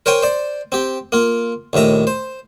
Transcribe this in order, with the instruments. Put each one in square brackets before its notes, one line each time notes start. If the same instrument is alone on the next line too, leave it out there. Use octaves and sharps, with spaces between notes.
[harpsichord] A#4 C5 C#5 G5 G#5
C5 D5
C4 G4
A#3 F4
A#1 D#2 A2 E5 A#5
C5